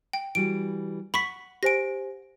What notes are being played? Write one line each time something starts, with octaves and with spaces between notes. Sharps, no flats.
G5
E3 G3 F#4 D7
F#5 B5 C#6 B6
G4 C5 G#5 A#6 D7